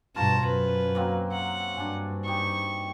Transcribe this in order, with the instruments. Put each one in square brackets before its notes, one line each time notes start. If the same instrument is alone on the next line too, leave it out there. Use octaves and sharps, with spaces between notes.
[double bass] G2 B2 [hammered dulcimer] F4 C5 C#5 [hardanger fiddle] A5 A#5
[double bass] F#2 [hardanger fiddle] B4
[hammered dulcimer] F#3 A#3 C4
[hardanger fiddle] F#5
[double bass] G2 [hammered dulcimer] D4 G#5
[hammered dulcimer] D#4 G4 [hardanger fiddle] C#6